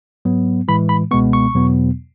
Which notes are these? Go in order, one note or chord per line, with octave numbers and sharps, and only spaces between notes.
G#2 F#3 B3
A2 E3 G#3 B5
B5
C#2 B2 G#3 B3 C#6
C#6
E2 B2 F#3 B3